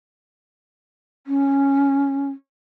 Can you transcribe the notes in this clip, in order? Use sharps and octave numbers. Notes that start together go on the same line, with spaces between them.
C#4